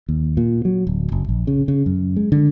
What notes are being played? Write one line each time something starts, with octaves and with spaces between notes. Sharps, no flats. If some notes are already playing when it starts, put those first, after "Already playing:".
D#2
A#2
F#3
D1
F#1
A#1
C#3
C#3
F#2
G#3
D3